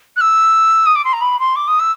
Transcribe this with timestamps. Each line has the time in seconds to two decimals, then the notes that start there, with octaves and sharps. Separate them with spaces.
0.16 F#6
0.20 E6
0.86 D#6
0.95 D6
1.04 C6
1.13 A#5
1.21 B5
1.39 C6
1.55 D6
1.67 D#6
1.79 E6